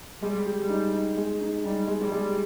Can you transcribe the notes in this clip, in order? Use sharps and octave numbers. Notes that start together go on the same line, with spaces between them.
G3 G#3
G4
G3
D#4
D#4
G#3
D#4
G3 D#4
G#3
G3
G#3